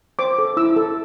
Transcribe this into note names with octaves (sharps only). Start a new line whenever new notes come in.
C5 D6
A4
E4 E6
A4